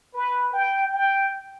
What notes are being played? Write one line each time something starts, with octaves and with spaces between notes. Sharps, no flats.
B4
G5
G5